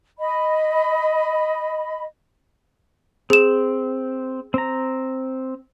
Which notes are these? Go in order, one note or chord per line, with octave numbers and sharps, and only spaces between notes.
D#5 B5
C4 G#4 E7
C4 A#5